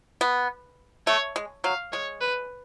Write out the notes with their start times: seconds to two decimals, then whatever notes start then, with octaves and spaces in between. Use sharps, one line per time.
0.21 B3
1.07 A3 C#5
1.36 G#3
1.64 F#3 F5
1.93 G#3 C#5
2.21 B4